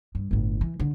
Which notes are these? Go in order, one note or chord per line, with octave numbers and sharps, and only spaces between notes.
G2
G1 A2
E3
D3